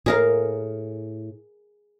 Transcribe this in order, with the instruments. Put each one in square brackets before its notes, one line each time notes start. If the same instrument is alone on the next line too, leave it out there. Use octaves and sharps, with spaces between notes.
[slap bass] A2 [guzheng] G#4 A#4 F5